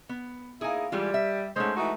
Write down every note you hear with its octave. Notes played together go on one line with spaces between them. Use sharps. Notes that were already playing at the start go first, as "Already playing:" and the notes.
B3
A#3 D#4 E4 G#4 G#5
E3 G3 G#3 F4
E5
G#2 G#3 A3 C#4 C5
E3 D#4 F#4